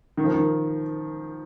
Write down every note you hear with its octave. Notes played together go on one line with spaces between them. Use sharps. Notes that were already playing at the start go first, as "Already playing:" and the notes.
D#3
F3
D#3